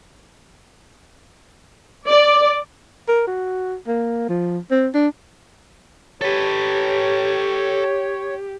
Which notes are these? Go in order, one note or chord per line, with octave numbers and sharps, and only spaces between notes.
D5
A#4
F#4
A#3
F3
C4
D4
G4 A4 B4 C#5